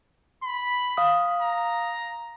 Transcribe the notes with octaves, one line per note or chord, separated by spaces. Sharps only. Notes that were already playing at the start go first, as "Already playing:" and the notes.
B5
F5 D#6
A#5